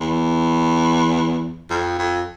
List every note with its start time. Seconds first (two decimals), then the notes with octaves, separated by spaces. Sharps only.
0.01 E2
1.70 F2
1.99 F2